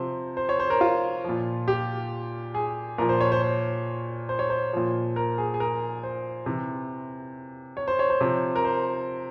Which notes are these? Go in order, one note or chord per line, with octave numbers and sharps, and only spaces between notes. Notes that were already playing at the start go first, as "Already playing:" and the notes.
Already playing: C3 F3 C5
C5
C#5
C5
A#4
F4
A#2 F3
G4
G#4
A#2 F3 A#4
C5
C#5
C5
C5
C5
C#5
C5
A#2 F3
A#4
G#4
G#4
A#4
C5
C3 E3
C#5
C5
C#5
C5
C3 F3
A#4
C5